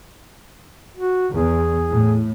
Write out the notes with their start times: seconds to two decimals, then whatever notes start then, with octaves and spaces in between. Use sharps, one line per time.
0.97 F#4
1.33 E2 G#4
1.90 A2